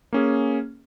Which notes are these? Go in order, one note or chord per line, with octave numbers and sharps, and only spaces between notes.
A#3 C#4 G#4